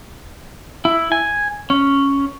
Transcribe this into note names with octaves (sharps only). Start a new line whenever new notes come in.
E4
G#5
C#4